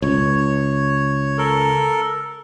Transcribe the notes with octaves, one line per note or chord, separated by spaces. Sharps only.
C#2 C#5
A4 A#4